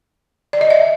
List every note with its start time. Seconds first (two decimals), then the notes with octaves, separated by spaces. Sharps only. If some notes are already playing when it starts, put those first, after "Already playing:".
0.53 D5
0.61 D#5
0.70 E5